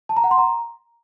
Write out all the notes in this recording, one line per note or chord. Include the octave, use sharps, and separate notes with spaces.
A5
A#5
F#5
C6
A#5